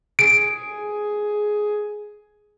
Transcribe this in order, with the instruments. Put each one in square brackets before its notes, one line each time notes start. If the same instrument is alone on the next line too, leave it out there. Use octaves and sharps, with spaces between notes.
[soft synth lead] G#4 [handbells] D7